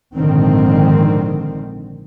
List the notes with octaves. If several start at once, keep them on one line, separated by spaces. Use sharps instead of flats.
A#1 G#2 D3 D#3 C4